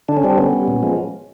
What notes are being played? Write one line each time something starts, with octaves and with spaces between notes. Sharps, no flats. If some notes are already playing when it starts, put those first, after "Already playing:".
D3 D4
C#4
G3 C4 D4
D3 B3 C#4
G3
A#2
F3 G#3